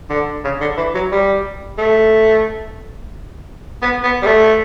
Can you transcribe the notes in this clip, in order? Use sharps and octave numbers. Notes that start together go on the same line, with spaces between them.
D3
C#3
D3
E3
F#3
G3
A3
B3
B3
G3
A3